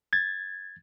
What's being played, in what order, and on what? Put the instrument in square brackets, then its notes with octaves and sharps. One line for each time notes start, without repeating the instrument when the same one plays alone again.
[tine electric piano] G#6 A6